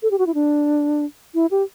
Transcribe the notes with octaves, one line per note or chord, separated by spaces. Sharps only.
A4
G4
F#4
E4
D4
E4
G4